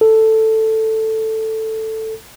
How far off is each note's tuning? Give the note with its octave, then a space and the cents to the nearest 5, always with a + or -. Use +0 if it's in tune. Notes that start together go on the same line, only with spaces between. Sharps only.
A4 +5